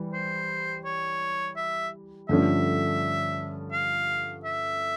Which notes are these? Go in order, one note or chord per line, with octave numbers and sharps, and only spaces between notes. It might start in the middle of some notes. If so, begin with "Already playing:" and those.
Already playing: E3 G3
C5
C#5
E5
G2 D3 F3 A3 C#4 E5
F5
E5